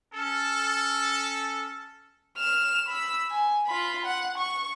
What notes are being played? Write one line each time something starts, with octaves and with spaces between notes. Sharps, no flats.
C#4 A4
F6 E7
B5 E6
G#5
F4 B5
F#5
C#6